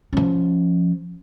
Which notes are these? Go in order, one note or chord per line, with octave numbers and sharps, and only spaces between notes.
F3 C#4